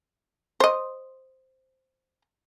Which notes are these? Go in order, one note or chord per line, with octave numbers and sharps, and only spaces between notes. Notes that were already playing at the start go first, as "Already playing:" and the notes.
C5 D#5